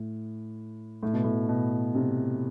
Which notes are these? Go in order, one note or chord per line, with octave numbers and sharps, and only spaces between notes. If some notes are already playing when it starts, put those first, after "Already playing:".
Already playing: A2
A2
B2
A2
B2
C3